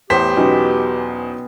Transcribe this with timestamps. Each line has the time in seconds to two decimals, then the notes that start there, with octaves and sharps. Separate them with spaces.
0.10 E2 A2 B3 G4 C5 G5 B6
0.36 B2 F#3 C#4 D#4 G#4 C6